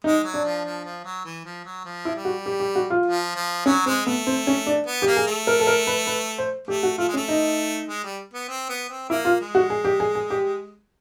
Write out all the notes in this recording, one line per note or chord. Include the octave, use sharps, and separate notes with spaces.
G#3 D#4
F#3
D4
F3
F3
F3
F#3
E3
F3
F#3
F3
E4
G3
F#4
G4
G4
F#4
F4
F3
F3
F#3 C#4
G#3 C4
A3 B3
C4
C#4
D4
B3
G4
A#3
G#4
A3
A#4
A4
A#4
B4
B4
C5
A3 G4
F#4
A3 F4
G#3
C#4
A3
D#4
G#3
G3
B3
C4
B3
C4
A#3 E4
F4
G#3
F#4
G#4
G4
G#4
G#4
G4